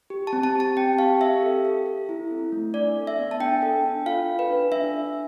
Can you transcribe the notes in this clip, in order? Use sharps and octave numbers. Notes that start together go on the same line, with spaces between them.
G4
A5
C4
A5
G4 A5
C4 G5
G4 F5
G4 E5
A4
A4
A4
E4
C4
A3
D4 D5
A4
E5
B3
A5
D4 G5
A4
D4
F4 F5
A4
B4
D4
D4 E5
D4